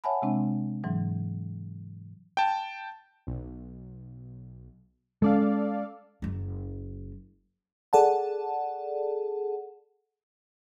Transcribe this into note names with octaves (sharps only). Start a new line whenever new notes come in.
C#5 E5 F#5 G#5 A5 B5
C3 G#3 C4 D4
G#2 E3 F#3
G5 A5
B1
G#3 C#4 A4 D5 F5
F#1 F#3
G#4 A4 D5 F#5 A5